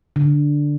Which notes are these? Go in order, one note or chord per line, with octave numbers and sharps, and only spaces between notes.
D3